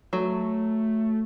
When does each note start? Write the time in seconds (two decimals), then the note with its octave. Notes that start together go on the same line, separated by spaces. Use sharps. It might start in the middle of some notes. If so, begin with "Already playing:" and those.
0.13 F#3 A3